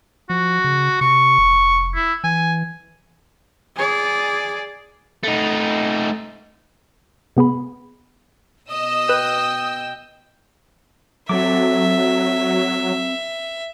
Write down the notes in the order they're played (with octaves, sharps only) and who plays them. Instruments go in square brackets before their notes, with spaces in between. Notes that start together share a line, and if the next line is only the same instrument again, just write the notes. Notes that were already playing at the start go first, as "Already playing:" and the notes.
[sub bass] F3 [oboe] F#4
[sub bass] C#3
[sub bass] C3 [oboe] C#6
[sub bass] F1
[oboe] E4
[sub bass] E3 [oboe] G#5
[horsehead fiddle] G#4 D5
[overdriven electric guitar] A3 D#4
[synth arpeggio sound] C3 B3 G#4 B5
[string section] B2 D#5 E6 [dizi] D#6
[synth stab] B4 F#6 [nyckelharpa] G5
[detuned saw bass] F#3 [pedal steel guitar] C4 A4 D6 [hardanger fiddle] E5